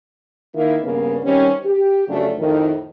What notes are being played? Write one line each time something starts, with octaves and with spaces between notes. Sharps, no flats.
D#3 A#3 E4
G2 C#3 A#3 B3
D#3 G3 C4 C#4
G4
F2 C#3 F3 F#3 A3 D4
F2 A2 D#3